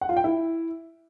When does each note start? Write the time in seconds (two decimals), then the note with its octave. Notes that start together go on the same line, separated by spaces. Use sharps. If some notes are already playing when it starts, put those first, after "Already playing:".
0.01 F#5
0.09 F4
0.17 G5
0.24 E4